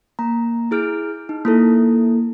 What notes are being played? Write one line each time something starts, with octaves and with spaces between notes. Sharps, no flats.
A#3 A#5
E4 G#4 F6 G6 D7
D#4
A#3 E4 A4